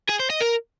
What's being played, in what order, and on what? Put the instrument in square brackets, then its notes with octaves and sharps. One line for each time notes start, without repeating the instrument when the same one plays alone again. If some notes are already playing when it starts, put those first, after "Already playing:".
[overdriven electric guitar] G#4
C5
D#5
A#4